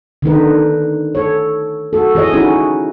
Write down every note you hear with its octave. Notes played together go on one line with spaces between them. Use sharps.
D3 D#3 D#4 B4
A4 C#5
F#4 A4
E3 G#4 C#5 D#5
C#4 D#4 E4 F#4 G#4